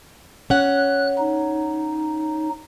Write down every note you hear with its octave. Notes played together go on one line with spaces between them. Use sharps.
C#4 F#5 F#6
D#4